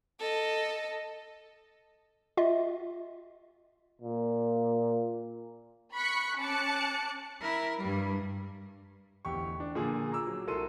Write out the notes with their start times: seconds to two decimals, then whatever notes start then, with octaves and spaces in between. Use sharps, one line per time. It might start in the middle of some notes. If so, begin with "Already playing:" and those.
0.19 A4 D#5
2.37 F4 D#5 E5
4.01 A#2
5.95 B5 C#6 F#6 B6 C#7
6.39 C#4 A5 D6 F#6 C#7
7.41 E4 A#4
7.79 G2 G3
9.25 D1 E2 G4 C#6
9.60 D4
9.75 A#2 D3 F3 G#4
10.12 A#5 D6 E6
10.27 F#3
10.47 C2 F#4 A4 A#4 C6 D#7